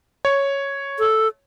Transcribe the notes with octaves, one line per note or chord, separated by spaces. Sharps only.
C#5
A4